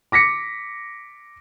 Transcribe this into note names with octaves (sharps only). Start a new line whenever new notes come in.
D6 A#6 B6 C#7